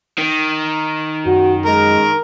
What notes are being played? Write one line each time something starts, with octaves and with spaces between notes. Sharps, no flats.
D#3
F#2 F#4
G#3 A#4